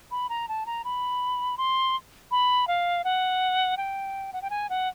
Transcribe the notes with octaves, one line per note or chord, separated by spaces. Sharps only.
B5
A#5
A5
A#5
B5
C6
B5
F5
F#5
G5
F#5
G5
G#5
F#5